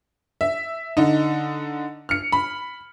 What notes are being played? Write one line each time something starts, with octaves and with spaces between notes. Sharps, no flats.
E5
D3 D#4
F6 C#7
B5